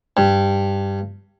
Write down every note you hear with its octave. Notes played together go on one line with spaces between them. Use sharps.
G2